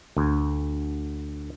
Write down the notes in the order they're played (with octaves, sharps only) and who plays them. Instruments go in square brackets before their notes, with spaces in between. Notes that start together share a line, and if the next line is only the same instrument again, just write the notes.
[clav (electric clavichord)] D2